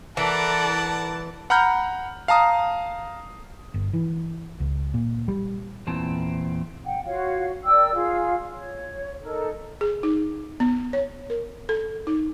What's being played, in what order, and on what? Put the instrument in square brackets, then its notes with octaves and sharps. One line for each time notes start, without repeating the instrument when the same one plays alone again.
[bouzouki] E3 [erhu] A4 [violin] A#4 D5 [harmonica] F#5 A5
[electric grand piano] F#5 A#5 B5 F6 G6
F5 A5 A#5 D#6
[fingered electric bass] G1
E3
C#2
A#2
G3
[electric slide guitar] E2 A#2 C4 A5
[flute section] F#5 G5
F4 F#4 C#5 F5
A#4 D5 G5 E6
F4 G#4 F5
C#5
D#4 A4 A#4
[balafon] G#4
D#4
B3
C#5
A#4
A4
D#4